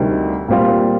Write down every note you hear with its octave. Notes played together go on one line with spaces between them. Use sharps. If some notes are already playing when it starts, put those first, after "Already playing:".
Already playing: D2 C3 D#3 G3
A#2 G3 C4 F4